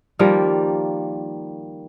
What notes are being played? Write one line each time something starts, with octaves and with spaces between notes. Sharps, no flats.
D#3 F3 G3 A#3